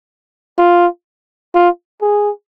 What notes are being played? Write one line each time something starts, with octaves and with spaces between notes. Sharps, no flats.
F4
F4
G#4